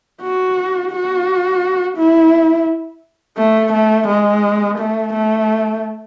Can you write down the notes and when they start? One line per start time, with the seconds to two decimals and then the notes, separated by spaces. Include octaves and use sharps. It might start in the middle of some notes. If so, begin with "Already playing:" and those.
0.22 F#4
0.91 F#4
1.97 E4
3.38 A3
3.73 A3
4.08 G#3
4.78 A3
5.13 A3